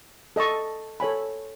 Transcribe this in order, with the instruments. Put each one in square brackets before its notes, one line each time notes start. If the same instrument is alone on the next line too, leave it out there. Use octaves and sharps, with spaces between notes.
[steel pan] A4 D#5 A5 C#6
A4 C#5 G#5 B5